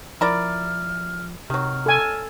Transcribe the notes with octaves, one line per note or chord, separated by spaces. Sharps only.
F3 E4 A#4 D5 F6
C3 D#3 F#3 F6
A4 G#5